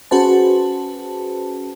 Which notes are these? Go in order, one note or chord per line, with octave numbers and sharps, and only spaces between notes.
C#4 F#4 G#4 B4 C5 A5